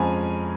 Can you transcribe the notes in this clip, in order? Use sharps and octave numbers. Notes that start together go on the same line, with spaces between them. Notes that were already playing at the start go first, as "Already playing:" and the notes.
Already playing: F2 F3 G#3 C#4 G#5 A#5 B5